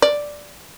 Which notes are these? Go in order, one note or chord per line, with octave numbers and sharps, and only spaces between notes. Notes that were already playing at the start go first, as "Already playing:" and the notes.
D5